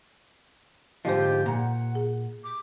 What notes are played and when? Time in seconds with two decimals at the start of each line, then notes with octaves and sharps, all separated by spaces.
1.05 G#2 D3 F3 G4 C5 D#5
1.46 A#2 A#3 F#5 A#5
1.95 G#4
2.43 D6